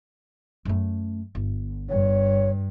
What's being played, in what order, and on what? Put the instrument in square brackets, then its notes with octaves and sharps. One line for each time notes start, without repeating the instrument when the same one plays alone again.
[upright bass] F#2 A3
G1
[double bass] G2 [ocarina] C#5